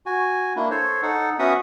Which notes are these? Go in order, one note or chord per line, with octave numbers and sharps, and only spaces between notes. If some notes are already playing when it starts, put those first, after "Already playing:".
F#4 G#5
A#3 D4 E4
A4 C5 C#5
D#4 A4 F#5
B3 C#4 F#4 E5 F#5 D#6